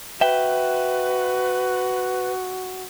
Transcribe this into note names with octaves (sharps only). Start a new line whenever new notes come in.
F#4 B4 E5 G5